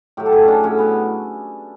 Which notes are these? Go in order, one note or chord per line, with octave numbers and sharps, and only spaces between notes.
A2 F#3 G4
A4
G#4
C#4
D4
A2 F#3 C#4
B3